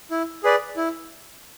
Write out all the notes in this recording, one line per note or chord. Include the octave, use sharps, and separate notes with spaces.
E4
G#4 B4 D5
E4